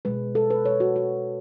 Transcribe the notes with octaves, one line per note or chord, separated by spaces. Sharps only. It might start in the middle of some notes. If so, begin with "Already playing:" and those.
B2 G#3 B4
A4
B4
C#5
F#4
F#4